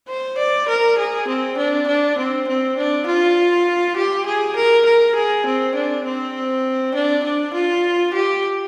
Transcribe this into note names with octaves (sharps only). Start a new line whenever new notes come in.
C5
D5
A#4
G#4
C4
D4
D4
C4
C4
D4
F4
G4
G#4
A#4
A#4
G#4
C4
D4
C4
D4
D4
F4
G4